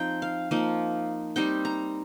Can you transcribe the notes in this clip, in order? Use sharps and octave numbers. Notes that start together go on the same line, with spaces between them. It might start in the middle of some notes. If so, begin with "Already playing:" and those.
Already playing: F3 C4 D#4 G5 A#5
F5
F3 A#3 D#4
G3 C4 D#4 G5
A#5